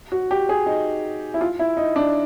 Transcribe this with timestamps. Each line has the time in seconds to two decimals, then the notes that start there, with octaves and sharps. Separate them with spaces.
0.12 F#4
0.31 G4
0.49 G#4
0.66 D#4
1.34 E4
1.41 F4
1.59 E4
1.77 D#4
1.96 D4